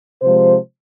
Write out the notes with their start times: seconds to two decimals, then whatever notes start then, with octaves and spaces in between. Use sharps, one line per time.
0.22 C3 F3 G#3 C5